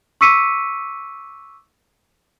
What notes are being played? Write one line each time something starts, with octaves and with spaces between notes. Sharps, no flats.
C#6 D6 E6 B6 C#7 D#7